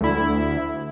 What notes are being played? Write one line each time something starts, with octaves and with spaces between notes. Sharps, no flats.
D2 E4